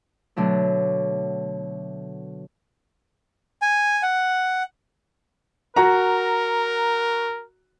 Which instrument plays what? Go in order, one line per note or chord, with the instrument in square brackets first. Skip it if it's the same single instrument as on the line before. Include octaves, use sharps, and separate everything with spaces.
[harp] B2 D3 F#3 A3
[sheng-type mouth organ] G#5
F#5
[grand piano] F#4 A#5 [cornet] A#4